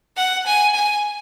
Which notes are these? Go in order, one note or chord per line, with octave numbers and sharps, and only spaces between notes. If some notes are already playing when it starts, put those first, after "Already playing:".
F#5
G#5
G#5